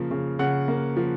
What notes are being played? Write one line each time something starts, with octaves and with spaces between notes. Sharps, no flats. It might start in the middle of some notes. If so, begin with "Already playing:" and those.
Already playing: C#3 F3 A#3
C#3
C#3 F#5
A#3
F3